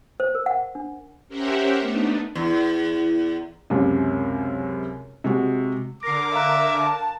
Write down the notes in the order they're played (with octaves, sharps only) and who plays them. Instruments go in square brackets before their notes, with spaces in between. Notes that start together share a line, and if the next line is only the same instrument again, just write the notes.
[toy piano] C5
A#4
F#5
D4
[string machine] C#4 G4 A#4 C5 E5 F#5
A3 B3 D4 D#4
[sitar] E2
[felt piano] C#2 F#2 C3
C3 G#3 F#4
[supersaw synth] D3 A#4 [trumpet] D6 [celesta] A#6 C7
[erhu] E5 [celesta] F5 A#5 F#6
[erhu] A5